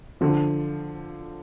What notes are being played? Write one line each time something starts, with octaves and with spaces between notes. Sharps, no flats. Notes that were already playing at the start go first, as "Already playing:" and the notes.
D3 F3